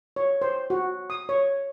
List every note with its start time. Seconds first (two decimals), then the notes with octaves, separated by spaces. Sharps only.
0.16 C#5
0.42 C5
0.70 F#4
1.10 D#6
1.29 C#5